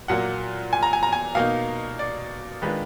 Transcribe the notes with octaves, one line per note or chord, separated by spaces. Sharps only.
A#2 F#3 A#3 F#5
G#5
A#5
G#5
A#5
G#5
B2 A#3 D#4 F5
D5
D#3 G#3 D4 F4 B4